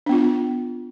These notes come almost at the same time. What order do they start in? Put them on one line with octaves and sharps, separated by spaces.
D4 B3 F4